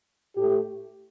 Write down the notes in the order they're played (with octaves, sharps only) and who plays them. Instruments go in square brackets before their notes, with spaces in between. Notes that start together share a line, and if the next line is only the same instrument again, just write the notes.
[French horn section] A2 A3 G4